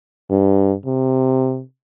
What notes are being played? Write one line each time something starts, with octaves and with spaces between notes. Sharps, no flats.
G2
C3